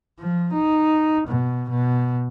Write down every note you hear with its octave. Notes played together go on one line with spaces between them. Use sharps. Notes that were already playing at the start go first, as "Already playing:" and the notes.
F3
D#4
B2
B2